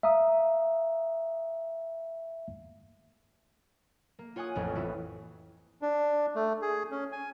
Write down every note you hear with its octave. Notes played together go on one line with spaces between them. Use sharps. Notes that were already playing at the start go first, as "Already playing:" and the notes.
E5 F5 A#5 D#6
A#3
F4 C#5 F#5 G#5 D#6
A1 F2
E3 E4 F#4
D4
A3
G#4
C#4
G#5